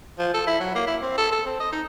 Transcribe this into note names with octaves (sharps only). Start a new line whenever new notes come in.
F3
A4
E4
F#3
A#3
E4
C4
A4
A4
C4
D#5
D#4